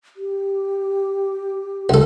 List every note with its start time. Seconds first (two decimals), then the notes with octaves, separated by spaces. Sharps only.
0.16 G4
1.89 C#2 A4